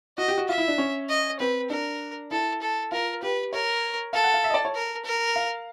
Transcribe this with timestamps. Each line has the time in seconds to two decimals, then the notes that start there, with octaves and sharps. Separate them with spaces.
0.18 F#4 D#5
0.28 G4
0.38 F#4
0.48 F4 E5
0.58 E4
0.68 D4
0.78 C#4
1.09 D#5
1.40 C4 B4
1.70 D4 A#4
2.31 E4 A4
2.62 A4
2.92 F4 A#4
3.22 G4 B4
3.53 A#4 C#5
4.13 A4 F5
4.24 F#5
4.34 F5
4.44 E5
4.50 D#5
4.54 D5
4.65 C#5
4.75 A#4
5.05 A#4
5.36 F5